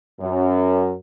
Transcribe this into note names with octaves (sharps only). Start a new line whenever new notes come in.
F#2